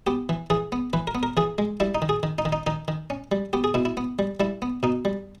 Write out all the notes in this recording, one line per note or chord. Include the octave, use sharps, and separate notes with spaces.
B3 G4
E3
E3 G#4
B3
E3 B4
A#4
B3
A#4
E3 G#4
G#3
G3 E4
D#4
D#3
G#4
D#3
D#4
D#3
D#4
D#3 D#4
D#3
C#4
G3
B3 G4
G#4
B2 E4
E4
B3
G3
G3 E4
B3
B2 D#4
G3